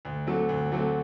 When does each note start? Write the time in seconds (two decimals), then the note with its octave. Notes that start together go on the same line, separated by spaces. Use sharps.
0.05 D2
0.27 D3 F#3 A3 C4
0.49 D2
0.72 D3 F#3 A3 C4